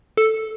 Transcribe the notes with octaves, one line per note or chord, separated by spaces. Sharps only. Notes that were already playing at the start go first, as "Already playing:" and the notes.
A4